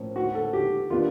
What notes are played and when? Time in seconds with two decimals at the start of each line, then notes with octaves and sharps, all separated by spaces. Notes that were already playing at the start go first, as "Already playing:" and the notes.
Already playing: A2 F3 A#3 C#4
0.16 F#4
0.35 A4
0.53 G4
0.90 D#3 G3 B3 D4 F4